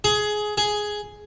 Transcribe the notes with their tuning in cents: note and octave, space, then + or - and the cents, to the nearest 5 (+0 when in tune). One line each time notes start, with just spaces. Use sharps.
G#4 +15
G#4 +5